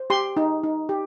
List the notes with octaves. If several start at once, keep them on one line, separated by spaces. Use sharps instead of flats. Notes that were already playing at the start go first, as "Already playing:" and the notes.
Already playing: C5
G4 C6
D#4
D#4
G4